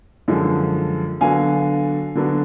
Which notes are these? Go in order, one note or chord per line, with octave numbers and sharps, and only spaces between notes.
F#2 D3 F3 G#3 D4
D3 F#3 B3 D4 F5 G#5
D3 F#3 B3 D4